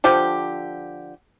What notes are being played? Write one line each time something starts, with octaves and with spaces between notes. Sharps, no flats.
D3 F3 G4